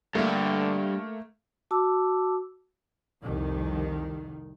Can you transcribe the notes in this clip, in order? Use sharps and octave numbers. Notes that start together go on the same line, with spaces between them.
G2 D3 A3 A#3
F#4 A5 D6 E6
C2 F2 D#3